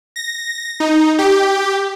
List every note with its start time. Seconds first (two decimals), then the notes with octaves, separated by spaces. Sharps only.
0.16 A#6
0.80 D#4
1.19 G4